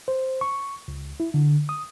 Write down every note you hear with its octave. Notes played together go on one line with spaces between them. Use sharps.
C5
C#6
C#2
E4
D3
D#6